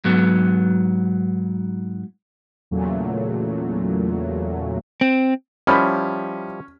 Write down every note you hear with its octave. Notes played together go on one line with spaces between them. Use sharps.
G#2 F#3 B3
E2 A#2 C#3 F#3 A3
C4
F3 G3 C#4 E4 B5 F6